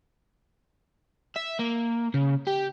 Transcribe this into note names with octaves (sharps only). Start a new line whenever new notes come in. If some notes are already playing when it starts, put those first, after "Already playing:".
E5
A#3
C#3
G4